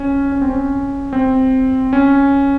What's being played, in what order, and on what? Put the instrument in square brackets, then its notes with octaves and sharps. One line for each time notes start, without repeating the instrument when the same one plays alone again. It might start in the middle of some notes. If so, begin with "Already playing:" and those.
Already playing: [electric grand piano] C#4
C#4
C4
C#4
C4
C#4